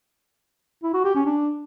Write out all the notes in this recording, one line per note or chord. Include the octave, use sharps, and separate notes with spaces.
E4
F#4
G4
C#4
D4